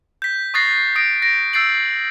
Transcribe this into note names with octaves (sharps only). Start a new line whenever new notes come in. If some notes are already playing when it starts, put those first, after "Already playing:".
G6 B6
C#6 D#6 F#6 A6 A#6 C7
D#6 A6 A#6 D7
G6 A#6 D7
E6 G6 A6 C7 D7 F#7